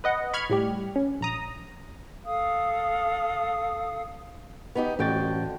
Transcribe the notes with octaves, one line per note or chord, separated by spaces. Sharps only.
B4 D#5 F#5
B5 C#6 F6 G#6
A2 G3 G4
C#4
A#1 A#5 D#6
A4 F5 D#6
B3 D#4 G4
A1 F2 D3 F#4 G5 A6